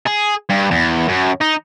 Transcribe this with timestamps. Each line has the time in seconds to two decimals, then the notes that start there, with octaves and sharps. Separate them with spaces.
0.06 G#4
0.49 G2
0.71 E2
1.09 F#2
1.41 D#4